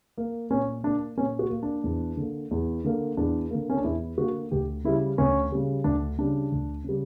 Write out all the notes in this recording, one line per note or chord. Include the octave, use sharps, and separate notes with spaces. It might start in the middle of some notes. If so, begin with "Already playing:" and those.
A#3
A#2 C#4
A#3 D4
A#2 C#4
F#4
A#3
D4
E2
D3 A#3
E2
D3 A#3
E2 D4
D3 A#3
C#4
D4
E2 E4
D3 A#3 F#4
D2 G4
C#3 G3 E4
D2 C#4
C#3 G3
D2 D4
C#3 G3 D4
D2
C#3 G3